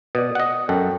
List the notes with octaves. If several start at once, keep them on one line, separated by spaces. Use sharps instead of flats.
B2 D5 D#6
D#5 F#5
F#2 A4 F#5 G5